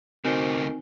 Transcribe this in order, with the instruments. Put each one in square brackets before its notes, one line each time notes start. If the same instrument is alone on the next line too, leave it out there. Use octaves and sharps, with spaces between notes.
[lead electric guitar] D2 C3 [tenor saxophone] D#3 [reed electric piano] C4 D#4 G#5 [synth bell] F#4 C5